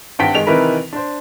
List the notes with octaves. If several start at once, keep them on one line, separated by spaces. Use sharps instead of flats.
G#1 G2 F#5 G5 B6 D7
D#3 G#3 F7
C3 D#3 E3 E4 A#4 B4
D4 C5